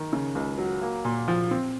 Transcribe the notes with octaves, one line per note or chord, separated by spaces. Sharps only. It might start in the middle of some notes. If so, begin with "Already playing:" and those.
Already playing: D#3
C#3
C#2
F#3
A#3
A#2
F3
C4